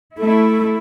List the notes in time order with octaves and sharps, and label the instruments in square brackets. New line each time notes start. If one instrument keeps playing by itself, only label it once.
[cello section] A3 E4 [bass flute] A4